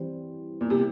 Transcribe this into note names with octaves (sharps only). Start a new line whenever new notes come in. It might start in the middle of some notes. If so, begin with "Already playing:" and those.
Already playing: E3 G3 C4
A#2
C3